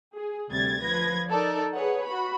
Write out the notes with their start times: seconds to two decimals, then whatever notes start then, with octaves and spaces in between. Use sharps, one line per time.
0.15 G#4
0.49 D2 C3 G3 G#6 A6
0.83 F3 B4 G#6 A#6
1.30 D#4 A4 A#4 D5
1.74 G#4 B4 C#5 F#5
2.05 F#4 B5